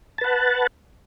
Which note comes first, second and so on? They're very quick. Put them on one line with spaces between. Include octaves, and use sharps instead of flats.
A5 B4 F#5